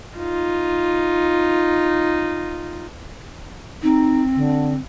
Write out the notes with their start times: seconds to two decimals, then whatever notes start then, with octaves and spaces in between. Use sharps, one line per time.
0.17 D#4 F4
3.83 C4 D#4
4.36 D3